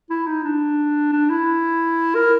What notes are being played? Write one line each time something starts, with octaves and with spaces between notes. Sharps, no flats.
E4
D#4
D4
D4
E4
A#4